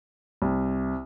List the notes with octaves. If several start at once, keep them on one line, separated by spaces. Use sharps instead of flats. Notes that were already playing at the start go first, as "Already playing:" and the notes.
C2